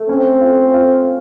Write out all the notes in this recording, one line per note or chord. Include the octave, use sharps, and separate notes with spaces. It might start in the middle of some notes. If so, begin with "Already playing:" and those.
Already playing: A3
C4 C#4
F4
F4